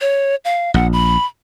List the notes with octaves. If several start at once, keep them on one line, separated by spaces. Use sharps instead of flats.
C#5
F5
A#1 F#5
B5